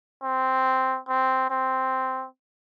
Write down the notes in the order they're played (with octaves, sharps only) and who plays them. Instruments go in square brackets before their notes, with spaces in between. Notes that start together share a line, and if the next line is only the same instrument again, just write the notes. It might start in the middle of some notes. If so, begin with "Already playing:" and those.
[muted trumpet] C4
C4
C4